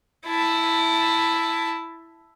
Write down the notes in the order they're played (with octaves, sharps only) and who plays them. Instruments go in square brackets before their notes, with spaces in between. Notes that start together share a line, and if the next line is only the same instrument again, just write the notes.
[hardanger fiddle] E4 A5